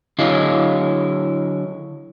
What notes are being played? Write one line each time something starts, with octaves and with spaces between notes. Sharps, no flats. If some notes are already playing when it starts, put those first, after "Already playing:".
D3 F#3 E4 G#4 D#5 F5